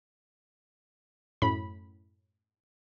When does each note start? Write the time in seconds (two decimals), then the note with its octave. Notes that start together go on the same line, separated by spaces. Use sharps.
1.42 F#2 A2 B5